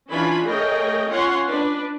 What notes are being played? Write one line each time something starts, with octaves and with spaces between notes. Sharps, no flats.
E3 C#4 D4 F4 G#5 B5
A3 G#4 A#4 C#5 D#5 G5
C#4 F4 C#5 F#5 C6
D4 B4